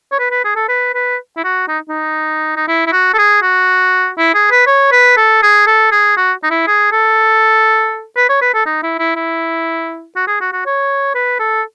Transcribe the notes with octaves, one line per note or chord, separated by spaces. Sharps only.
C#5
B4
B4
G#4
A4
B4
B4
E4
F#4
D#4
D#4
D#4
E4
E4
F#4
A4
G#4
F#4
E4
G#4
B4
C#5
B4
A4
G#4
A4
G#4
F#4
D#4
E4
G#4
A4
B4
C#5
B4
A4
D#4
E4
E4
E4
F#4
G#4
F#4
F#4
C#5
B4
A4